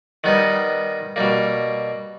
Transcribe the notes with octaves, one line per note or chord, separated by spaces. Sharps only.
D#3 G3 B3 D#4
B2 G3 A#3